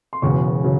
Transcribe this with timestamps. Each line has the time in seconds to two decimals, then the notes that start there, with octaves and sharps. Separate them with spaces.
0.13 C6
0.22 E1 E2 C#3 F#3 C#6
0.64 C#3 F#3